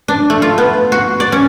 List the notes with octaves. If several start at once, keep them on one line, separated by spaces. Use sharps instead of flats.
D4
A3
F4
B3
F#4
D5
C#4